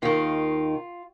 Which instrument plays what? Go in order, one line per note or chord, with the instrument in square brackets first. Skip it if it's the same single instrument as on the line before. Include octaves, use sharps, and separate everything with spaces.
[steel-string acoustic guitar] D#2 D#3 F4